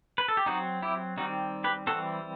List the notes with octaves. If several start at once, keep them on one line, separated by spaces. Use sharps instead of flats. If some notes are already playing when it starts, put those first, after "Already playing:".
B4
A4
G4
F#3 C4 D#4 F#4
E4 G4
D#3 G3 C4 D#4 F#4
G4 B4
E3 G3 C4 F#4 A4